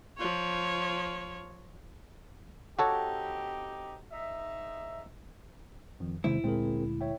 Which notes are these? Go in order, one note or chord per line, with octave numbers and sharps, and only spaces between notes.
F3 C#5
C4 D#4 F#4 G4 A4 C#5
G#2 D#4 E5
F2 D#3 F3
E2 C3 D#3 G#3 E4 C5
D2 A#2 G#3 C4 G#4 A#4
C#5 E5 G5